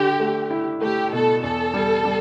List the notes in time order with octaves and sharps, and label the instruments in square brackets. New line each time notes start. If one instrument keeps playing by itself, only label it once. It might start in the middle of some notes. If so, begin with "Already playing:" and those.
Already playing: [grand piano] D3 [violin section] G4
[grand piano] A3
E4
[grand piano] A3 [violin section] G4
[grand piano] B2 [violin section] A4
[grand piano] E2 [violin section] A4
[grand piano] G3
G3